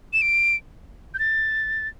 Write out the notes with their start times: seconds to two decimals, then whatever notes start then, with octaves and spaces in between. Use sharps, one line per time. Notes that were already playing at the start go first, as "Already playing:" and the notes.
0.13 E7
0.22 D7
1.14 G6
1.19 A6